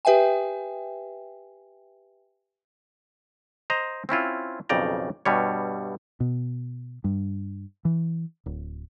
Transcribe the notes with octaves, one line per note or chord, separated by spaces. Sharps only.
G4 B4 E5 G5 G#5
C5 D#5 A#5
C4 C#4 E4 F4
B1 F2 C#3 D5 G5 A#5
G2 B2 G3 C#5
B2
G2
E3
D1